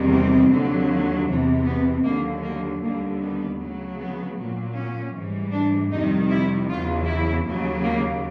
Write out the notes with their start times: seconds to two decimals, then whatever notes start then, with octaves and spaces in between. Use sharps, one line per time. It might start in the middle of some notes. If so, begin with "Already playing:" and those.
Already playing: E2 C3 D#3 G3
0.11 C4
0.50 D#2 D3 F#3
1.27 E2 C3 E3
1.65 B3
2.05 D#2 D3 F#3 A#3
2.43 A#3
2.81 D#2 D3 G3 A#3
3.21 B3
3.58 D2 C#3 F#3
3.98 B3
4.36 A#2 F#3
4.75 C#4
5.14 G#2 E3 G3
5.52 D4
5.90 F2 C3 D#3 G3 D#4
6.30 E4
6.68 E2 C#3 F#3 F4
7.07 E4
7.46 D#2 C#3 F#3
7.84 A#3